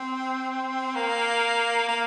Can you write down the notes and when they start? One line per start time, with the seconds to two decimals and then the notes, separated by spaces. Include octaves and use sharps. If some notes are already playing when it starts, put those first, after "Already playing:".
Already playing: C4
0.95 A#3
1.88 A#3